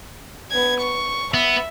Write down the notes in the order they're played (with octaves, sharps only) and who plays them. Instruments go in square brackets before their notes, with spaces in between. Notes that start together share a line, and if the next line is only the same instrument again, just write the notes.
[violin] B3 G#6
C#6
[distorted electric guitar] B3 [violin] E5